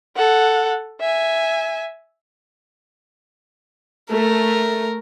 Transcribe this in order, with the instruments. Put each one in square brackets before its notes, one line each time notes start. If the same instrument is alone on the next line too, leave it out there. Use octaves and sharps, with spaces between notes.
[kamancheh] A4 F#5
E5 G#5
[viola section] A3 [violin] A#4